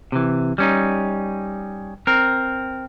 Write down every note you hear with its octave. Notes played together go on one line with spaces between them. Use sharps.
C3 E3
G3 C#4 D#4
C4 A#4